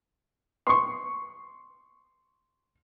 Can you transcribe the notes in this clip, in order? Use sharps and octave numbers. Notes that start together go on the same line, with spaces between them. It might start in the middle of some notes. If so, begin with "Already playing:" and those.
C6 C#6